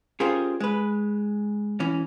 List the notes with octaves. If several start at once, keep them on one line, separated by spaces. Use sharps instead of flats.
C#4 F4 G4 G#4 A#4 C5
G#3 B4
E3 C#4